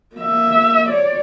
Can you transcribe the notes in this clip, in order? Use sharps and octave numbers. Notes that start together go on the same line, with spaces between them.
A#3 E5
C#5 D5